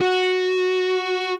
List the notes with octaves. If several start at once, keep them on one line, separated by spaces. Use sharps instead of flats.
F#4